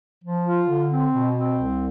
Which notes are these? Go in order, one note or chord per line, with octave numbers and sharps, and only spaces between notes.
F3
F4
D3
C4
B2
C4
C2